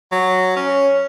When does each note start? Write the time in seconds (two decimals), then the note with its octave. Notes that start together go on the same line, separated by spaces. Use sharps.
0.12 F#3
0.56 C#4 C#5